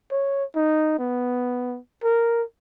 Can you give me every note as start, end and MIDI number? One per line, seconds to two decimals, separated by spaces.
0.11 0.44 73
0.55 0.98 63
0.99 1.78 59
2.04 2.42 70